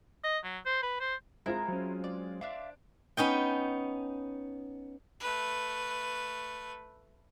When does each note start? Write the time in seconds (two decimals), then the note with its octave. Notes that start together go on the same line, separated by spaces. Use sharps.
0.24 D#5
0.44 F#3
0.66 C5
0.82 B4
1.00 C5
1.46 G#3 C4 E4 F4 A#4 A#5
1.68 F#3 C#4
2.04 D5
2.41 D4 C5 D5 E5 F5
3.17 B3 C#4 D#4 G5
5.20 A3 B4